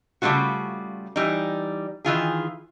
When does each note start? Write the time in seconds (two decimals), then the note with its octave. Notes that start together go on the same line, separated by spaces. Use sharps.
0.22 C#3 G3 A3 C4 F4 F#4
1.16 E3 G3 D#4
2.05 D#3 E3 F4 G#4